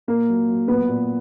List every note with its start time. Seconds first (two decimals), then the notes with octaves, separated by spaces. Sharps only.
0.08 A#2 A#3 A#4
0.29 F#3
0.49 F#3
0.68 A#2 B3 B4
0.88 A#2